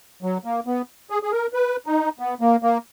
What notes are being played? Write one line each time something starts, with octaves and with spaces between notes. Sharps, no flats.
F#3
A#3
B3
G#4
G#4
A#4
B4
D#4
B3
A#3
A#3